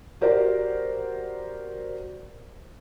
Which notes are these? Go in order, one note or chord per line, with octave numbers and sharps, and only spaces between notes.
F#4 G4 A#4 C5 D5